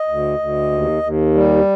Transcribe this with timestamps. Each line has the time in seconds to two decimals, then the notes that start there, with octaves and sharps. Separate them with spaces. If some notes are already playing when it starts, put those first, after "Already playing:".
Already playing: D#5
0.08 D2
0.39 D2
0.71 D#2
1.03 D#2
1.34 G3